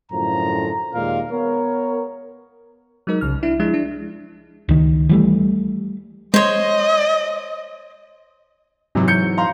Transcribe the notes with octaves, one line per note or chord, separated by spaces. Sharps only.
F#2 A2 D3 F3 A#5
D#2 A#2 G#3 A#3 A#4 F5
B3 A#4 C#5
F#3 G#3 D#4 A#4
C2 C#3 F6
D4 E4
F3 G#3 D4 E4
D4
C#2 D#3
E3 G3 A3
G#3 C5 C#5 D#5
G#2 C3 E3 F#3
G6 C#7
F5 A#5 C6